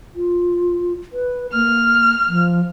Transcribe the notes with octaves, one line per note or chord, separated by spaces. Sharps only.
F4
B4
A#3 F6
F3